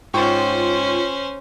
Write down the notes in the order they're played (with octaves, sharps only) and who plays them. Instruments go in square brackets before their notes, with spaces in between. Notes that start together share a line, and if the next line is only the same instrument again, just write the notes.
[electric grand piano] G#2 G5 C#6 [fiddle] C#4 C5 [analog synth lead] F4